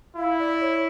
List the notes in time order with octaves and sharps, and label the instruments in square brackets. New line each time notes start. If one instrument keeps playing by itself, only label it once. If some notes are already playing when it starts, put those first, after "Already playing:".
[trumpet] E4 [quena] F5
[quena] D5
C#5